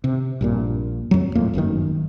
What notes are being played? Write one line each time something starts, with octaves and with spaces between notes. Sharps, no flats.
C3
A#1 G2 A#2
F2 F#3
D#1 F2 A2 A#3
G1 F#2 B2 D#3